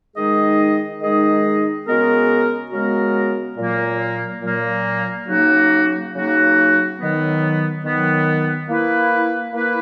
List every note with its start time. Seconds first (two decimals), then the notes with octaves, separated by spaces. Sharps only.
0.16 D#3 G#3 D#4 G#4 D#5
1.02 D#3 G#3 D#4 G#4 D#5
1.86 C#3 G#3 B3 F#4 A#4
2.72 C#3 G#3 B3 F#4 A#4
3.57 A#2 F#3 A#3
4.42 A#2 F#3 A#3
5.28 C#3 F#3 A#3 D#4 F#4
6.13 C#3 F#3 A#3 D#4 F#4
6.98 D#3 F#3 B3
7.84 D#3 F#3 B3
8.69 A#3 E4 B4
9.53 A#3 E4 B4